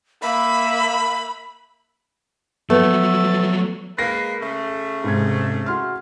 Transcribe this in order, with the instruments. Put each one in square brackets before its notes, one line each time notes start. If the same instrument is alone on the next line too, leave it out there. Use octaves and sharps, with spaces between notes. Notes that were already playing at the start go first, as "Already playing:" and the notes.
[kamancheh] A#3 E5 [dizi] B5
[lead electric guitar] F3 F#3 [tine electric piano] A3 [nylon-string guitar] B3 [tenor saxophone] A4
[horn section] G#3 A#3 B4 [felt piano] A#6 C7
[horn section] C#3 A3
[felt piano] G#2 C3 G#6
F#4 C6 F6